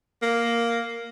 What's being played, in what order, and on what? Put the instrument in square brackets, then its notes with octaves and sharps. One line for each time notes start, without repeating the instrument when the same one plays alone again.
[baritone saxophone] A#3